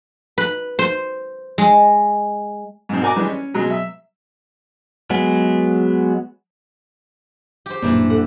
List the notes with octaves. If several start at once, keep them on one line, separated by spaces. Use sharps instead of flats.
B4
C5
G#3
G#2 B2 C4
F#4 A#4 D5 G#5 A#5 D6
E3 G3 G#3 D4
C#4
B2 F#3 G#3
E5
F#3 G#3 B3
G4 C5
A1 F#2 A#2 E3 G3 A#3 D4
A4 F#5